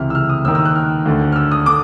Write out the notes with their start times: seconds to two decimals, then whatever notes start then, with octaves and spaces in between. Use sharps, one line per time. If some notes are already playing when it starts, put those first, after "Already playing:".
Already playing: C#2 C3 E3 F6
0.10 E6
0.15 F6
0.29 D#6
0.45 D#2 E6
0.48 D#3
0.55 E6
0.65 F#6
0.75 F6
1.06 D2 D3
1.32 F6
1.36 E6
1.51 D#6
1.66 D3 D6